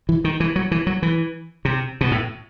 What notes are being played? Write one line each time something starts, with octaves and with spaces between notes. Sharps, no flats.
E3
D#3
E3
F#3
E3
F#3
E3
C3
B2
A2